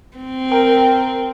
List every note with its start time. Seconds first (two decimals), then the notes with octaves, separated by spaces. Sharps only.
0.17 C4
0.52 A#4 G5